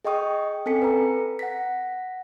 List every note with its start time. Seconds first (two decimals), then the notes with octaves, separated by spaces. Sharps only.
0.05 G#4 D#5 G5 C#6 D#6
0.66 C4 C#4 A4 G#5 B6 C#7
0.82 B4 A#5
1.39 F#5 A#6 B6